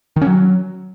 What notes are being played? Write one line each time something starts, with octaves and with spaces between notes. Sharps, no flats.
D#3
C#4
F#3